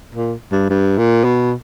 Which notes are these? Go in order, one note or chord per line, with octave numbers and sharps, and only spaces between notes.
A#2
G2
G2
A#2
B2